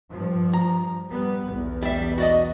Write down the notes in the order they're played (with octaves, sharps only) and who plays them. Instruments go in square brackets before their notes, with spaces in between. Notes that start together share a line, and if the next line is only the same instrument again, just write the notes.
[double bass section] G2 F3
[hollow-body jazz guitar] A#5
[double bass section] G3 B3
B1 E2
[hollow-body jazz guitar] G3 E5
F#4 D5 D#5